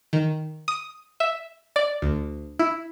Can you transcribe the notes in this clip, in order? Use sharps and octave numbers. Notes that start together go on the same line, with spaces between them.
D#3
D#6
E5
D5
D2
E4